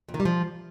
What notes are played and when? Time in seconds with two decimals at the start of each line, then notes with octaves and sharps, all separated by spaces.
0.08 F2
0.14 D#3
0.20 G3
0.25 F3